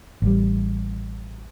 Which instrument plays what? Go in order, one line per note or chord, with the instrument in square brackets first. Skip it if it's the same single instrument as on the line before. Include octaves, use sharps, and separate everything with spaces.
[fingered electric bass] A1 G3